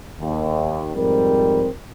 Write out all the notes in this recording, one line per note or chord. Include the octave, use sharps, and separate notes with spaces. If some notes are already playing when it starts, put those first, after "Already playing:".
D#2
F2 G#2 G3 C4 A#4